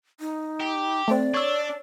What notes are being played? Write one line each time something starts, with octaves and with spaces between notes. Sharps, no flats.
D#4
G4
A3 C4 D5
D4 C#5 E6